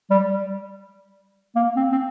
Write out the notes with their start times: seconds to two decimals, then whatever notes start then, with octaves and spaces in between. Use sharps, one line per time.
0.10 G3
1.56 A#3
1.76 C4
1.92 C4